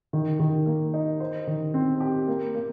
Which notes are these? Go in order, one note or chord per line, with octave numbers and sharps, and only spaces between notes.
D#3
D#3
A#3
D#4
C5
D#3
C4
G4
A#3
A#3